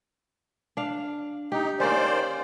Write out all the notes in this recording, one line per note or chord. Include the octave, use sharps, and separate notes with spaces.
D4 F5
D#4 G4
D#3 A#3 C#4 C5 D5